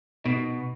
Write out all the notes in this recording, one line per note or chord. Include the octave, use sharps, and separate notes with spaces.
B2 B3 D#4